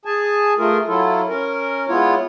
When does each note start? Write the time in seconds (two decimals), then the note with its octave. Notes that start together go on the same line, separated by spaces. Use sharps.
0.05 G#4 G#5 A5
0.59 A3 F4 G#4 A#4
0.88 F#3 E4 F4 A4
1.29 C#4 A#4
1.89 G#3 B3 E4 F4 C#5